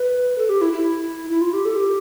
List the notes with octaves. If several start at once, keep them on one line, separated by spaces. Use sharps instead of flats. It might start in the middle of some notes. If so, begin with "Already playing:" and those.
Already playing: B4
A4
G4
E4
E4
E4
F4
G4
A4
G4